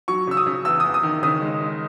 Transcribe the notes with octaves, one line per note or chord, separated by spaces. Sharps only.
F#3 C#6
C#3 E6
D#6
C#3
E2 E6
E2 D#6
D#6
D#3
C#3 D#6
G#3
G#3